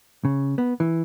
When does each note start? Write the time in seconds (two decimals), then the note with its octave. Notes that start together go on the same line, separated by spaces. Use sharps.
0.25 C#3
0.58 B3
0.80 E3